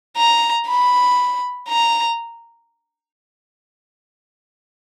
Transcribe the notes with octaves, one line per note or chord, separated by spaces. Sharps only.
A#5
B5
A#5